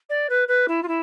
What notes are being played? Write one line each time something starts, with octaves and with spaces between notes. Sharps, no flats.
D5
B4
B4
E4
F4
E4